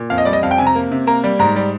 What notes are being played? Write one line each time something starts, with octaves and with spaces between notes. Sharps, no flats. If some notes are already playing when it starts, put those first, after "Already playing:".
Already playing: A#2
F2 F5
D#5
G3 D5
D#5
F2 F5
G5
C3 G#5
A#5
A#3
C3
A#3 A#5
G3
G#2 A#5
G3